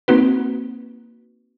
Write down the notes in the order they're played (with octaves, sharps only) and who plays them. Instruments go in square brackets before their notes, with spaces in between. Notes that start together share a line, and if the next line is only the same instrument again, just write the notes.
[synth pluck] A#3 C4 D#4 F#4 B4